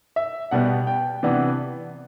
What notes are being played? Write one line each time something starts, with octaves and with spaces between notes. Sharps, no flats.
E5
B2 G3 B3 F#5
G5
C3 E3 B3 D4